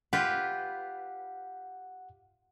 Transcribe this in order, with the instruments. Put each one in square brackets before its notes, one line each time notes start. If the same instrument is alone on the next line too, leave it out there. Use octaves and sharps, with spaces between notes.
[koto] F4 G4 B4 [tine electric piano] F#5